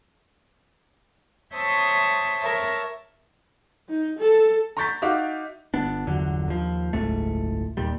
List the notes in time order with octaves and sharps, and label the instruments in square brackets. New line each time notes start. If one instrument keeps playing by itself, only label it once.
[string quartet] C5 C#5 E5 A5 C6 D#6
A#4 C#5 E5 A5
[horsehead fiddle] D#4
A4
[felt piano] A#5 C6 C#6 G6 A6 B6
D#4 F#4 E5 F5 D6
[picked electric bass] G1 B3 D4
G1 E2 D3 F#3
D#2 F3
F#1 C#2 G#2 A3
D#2 A#2 G3